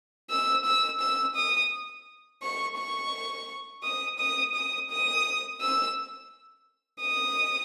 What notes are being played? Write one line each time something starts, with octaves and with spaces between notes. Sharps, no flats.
E6
E6
E6
D#6
C#6
C#6
D#6
D#6
D#6
D#6
E6
D#6